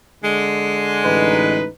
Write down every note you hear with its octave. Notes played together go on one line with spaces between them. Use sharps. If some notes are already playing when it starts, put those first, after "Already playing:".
D3 G#3
A1 D#4 B4